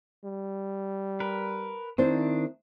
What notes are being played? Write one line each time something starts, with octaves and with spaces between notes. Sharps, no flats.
G3
A#4 B4
D#3 C4 D4 E4 C5